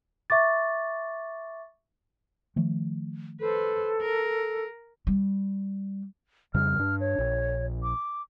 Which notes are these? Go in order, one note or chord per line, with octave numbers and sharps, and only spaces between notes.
E5 C#6 D6 A6
D#3 F3 A3
A4 B4 C5
A#4
G3
F2 C#3 G3 F6
G2 D4
C#5
A#1
D6